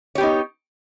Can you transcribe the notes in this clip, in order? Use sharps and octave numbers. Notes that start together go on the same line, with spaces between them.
B3 D#4 G4 C#5